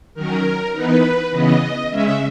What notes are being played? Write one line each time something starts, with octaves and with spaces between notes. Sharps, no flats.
D#3 F#3 C#4 A#4
E3 B3 D#4 B4
C#3 E3 B3 D#5
C#3 G#3 C#4 E5